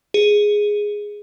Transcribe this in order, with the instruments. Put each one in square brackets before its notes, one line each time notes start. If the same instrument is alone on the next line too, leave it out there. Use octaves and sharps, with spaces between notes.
[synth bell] G#4